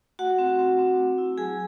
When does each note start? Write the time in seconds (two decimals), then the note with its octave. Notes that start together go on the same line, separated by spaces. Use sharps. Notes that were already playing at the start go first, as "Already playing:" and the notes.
0.19 A3 F#4 F#5
0.38 C4
0.59 C4
0.79 C4
0.99 A3
1.18 E4
1.38 F#3 G#4 G#5